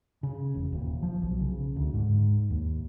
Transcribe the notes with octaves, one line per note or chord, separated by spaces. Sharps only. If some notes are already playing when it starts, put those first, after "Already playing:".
C#3
E1
D#1
F3
B1
C#3
D2
G#2
D#2